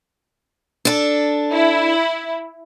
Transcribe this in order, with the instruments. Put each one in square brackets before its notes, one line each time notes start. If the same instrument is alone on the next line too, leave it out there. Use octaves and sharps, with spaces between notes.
[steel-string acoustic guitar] D4 A4
[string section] E4